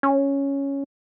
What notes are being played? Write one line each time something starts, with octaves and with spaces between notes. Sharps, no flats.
C#4